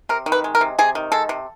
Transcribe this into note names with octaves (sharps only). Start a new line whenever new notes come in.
C3 A#4
D#3
B4
G#3
A#4
C3
C3 G#4
D#3
G#3 A4
C3